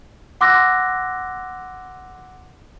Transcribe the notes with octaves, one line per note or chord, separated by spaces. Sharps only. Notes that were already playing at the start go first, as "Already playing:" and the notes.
F#5 C6 D6 E6 F#6 A#6